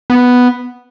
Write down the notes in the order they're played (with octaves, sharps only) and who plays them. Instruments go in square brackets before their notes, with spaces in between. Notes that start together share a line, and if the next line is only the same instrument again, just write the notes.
[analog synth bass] B3